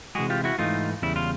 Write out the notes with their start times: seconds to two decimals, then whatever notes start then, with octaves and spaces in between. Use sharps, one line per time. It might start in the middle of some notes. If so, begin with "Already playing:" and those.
0.15 C3 E3 G#3 F#4 G#4
0.30 F4 G4
0.44 E4 F#4
0.59 G#2 E3 A3 D#4 F4
1.02 E2 C#3 G3 E4
1.16 F4